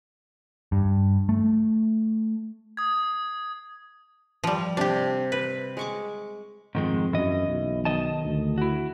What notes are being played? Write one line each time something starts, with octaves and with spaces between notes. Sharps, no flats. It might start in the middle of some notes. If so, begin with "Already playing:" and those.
G2
A3
D#6 G#6
F3 G3
C3 D4 G4
B4
G#3 C#6 D6
F2 G#2 D#3 G#3
F#2 E3 D#5
B1
D#3 D#5 A5
D2
E4 F#4